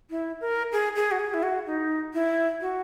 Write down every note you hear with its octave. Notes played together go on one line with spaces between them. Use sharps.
E4
A#4
G#4
G#4
F#4
G#4
E4
F#4
D#4
E4
F#4